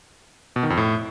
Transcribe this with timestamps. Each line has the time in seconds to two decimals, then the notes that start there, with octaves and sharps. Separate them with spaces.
0.56 B2
0.63 D#3
0.70 F2
0.77 A2